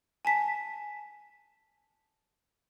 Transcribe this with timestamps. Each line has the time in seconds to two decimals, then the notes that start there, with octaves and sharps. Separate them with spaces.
0.25 G#5 A5 B6